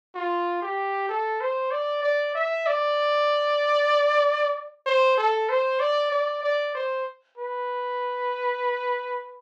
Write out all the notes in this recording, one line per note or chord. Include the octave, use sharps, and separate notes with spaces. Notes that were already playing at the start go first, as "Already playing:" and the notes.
F4
G4
A4
C5
D5
D5
E5
D5
C5
A4
C5
D5
D5
D5
C5
B4